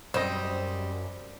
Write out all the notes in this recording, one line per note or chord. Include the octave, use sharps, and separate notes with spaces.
F#2 G3 C4 D#5